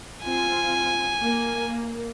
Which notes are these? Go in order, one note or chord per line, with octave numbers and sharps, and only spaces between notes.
C4 F4 G#5
A#3